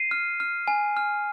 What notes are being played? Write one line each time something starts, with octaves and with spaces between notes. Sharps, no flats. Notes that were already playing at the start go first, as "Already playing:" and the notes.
Already playing: C7 D#7
F6
F6
G#5
F6